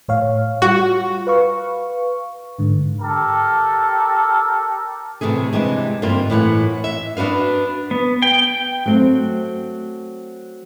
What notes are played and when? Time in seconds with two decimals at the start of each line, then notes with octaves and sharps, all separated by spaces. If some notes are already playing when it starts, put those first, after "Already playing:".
0.08 A2 C#5 F5
0.62 G3 F4 F#4 F#5
1.27 B4 F5 C#6
2.59 G#2 D3
3.01 G4 A4 A#4
5.21 A2 C3 E3 A3 G#4
5.53 C3 E3 G3 G#3 D4
6.02 G2 D3 A#3 C4 F4
6.30 A2 E3 F5 F#5
6.84 E5
7.17 B3 D4 F#4 B4 F5
7.91 B3
8.22 G5
8.86 F#3 A3 C4